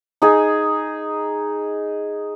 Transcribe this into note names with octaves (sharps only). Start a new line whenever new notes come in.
D#4 G#4